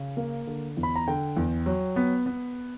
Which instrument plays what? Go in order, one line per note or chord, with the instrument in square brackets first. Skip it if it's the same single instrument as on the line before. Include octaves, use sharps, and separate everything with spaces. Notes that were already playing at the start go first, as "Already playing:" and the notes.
Already playing: [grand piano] C#3
A#3
D3
E2
B5
A#5
D3 G5
E2
F#3
B3
B3